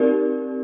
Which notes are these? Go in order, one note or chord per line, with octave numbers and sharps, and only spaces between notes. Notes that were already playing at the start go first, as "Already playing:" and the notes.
Already playing: C4 D#4 G4 A#4 D5